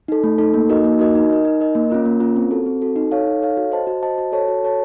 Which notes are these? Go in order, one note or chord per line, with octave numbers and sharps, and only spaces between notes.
D#4 A4
A3
D#4 A4
A#3
D#4 F#4 A#4 D#5
A#3
D#4 F#4 A#4 D#5
D#4
A#4 D#5
D#4
A#4 D#5
A#3
C#4 F4 A#4
A#3
C#4 F4 A#4
C4
F#4 A4
C4
F#4 A4
D#4
A4 C#5 F5
D#4
A4 C#5 F5
F#4
C5 D#5 A5
F#4
C5 D#5 A5
F#4
A4 C#5 A5
F#4
A4 C#5 A5